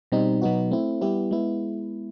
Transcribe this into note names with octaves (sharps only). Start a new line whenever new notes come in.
B2 G3 C4 D#4
B2 F#3 B3 D#4 F#4
A3 C4 E4
G3 B3 E4 G4
G#3 B3 E4